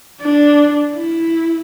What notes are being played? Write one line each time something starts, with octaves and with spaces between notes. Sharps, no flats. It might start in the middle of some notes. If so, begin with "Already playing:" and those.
D4
E4